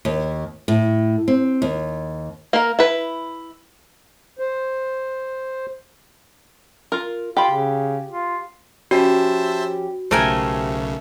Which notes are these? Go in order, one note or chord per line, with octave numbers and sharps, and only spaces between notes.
D#2
A2
C4
D#2
A#3 A#4
E4 B4
C5
F4 A#4
F4 G4 G5 B5
C#3
F4
F3 C#4 F#4 G4 C5 E5 A5
B1 C#3 A3 F4 G4 A#4 C5 G#5